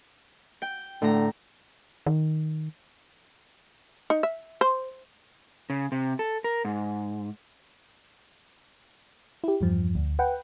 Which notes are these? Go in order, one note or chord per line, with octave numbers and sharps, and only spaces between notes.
G5
A2 D3 A#5
D#3
D#4
E5
C5
C#3
C3
A4
A#4
G#2
E4 G4
E2 G2 F3
D2
B4 F#5 G5